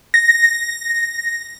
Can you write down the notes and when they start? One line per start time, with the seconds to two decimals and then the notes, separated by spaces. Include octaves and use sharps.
0.14 A#6